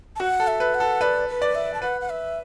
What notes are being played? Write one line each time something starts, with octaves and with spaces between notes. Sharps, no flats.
A5
F#4 F#5
A4
E5
B4
F#5
A4
B4 D5
B4
D5
E5
A5
B4 F#5
F#5
E5